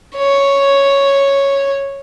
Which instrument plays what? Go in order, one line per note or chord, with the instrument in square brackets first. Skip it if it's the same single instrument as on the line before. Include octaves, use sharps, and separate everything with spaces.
[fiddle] C#5